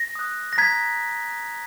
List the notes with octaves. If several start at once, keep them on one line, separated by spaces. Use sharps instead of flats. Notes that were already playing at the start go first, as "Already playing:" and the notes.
Already playing: A#6
D#6 F#6
A#6
A#5 G#6 B6